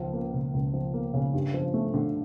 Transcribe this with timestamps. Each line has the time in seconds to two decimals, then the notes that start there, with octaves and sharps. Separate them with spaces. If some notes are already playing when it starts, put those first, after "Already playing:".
Already playing: C#2 F3
0.13 A#3
0.34 C#3
0.54 C#2
0.74 F3
0.93 A#3
1.14 C#3
1.34 G2
1.54 F3
1.74 A3
1.94 D3